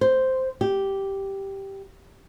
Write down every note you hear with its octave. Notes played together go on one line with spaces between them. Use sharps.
C5
G4